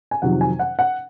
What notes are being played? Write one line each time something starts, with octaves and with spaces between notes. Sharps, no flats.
G#5
F2 C3 D#3 F#3 F#5
G#5
F#5
F#5